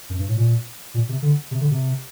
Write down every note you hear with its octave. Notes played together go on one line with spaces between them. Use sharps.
F#2
G2
A2
A#2
A#2
C3
D3
C3
D3
C3